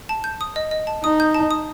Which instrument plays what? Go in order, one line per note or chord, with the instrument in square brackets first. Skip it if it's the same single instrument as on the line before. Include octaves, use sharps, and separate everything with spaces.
[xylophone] A5
G6
D#6
D#5
D#5
A5
[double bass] D#4 [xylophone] D#6
[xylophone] G6
A5
D#6